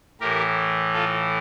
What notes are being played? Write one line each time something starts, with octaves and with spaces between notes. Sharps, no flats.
A2 E3 G4 A#4
F4 A4